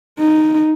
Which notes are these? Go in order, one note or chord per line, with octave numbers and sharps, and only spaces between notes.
D#4